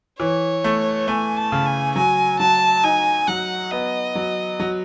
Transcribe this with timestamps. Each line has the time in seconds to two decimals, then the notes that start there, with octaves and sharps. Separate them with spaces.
0.19 E3 C#5
0.64 A3
1.08 A3 G#5
1.37 A5
1.52 C#3
1.66 G#5
1.96 F#3 G#5
2.40 F#3 A5
2.84 D#4 G#5
3.28 F#3 F#5
3.71 B3 D#5
4.15 F#3
4.60 F#3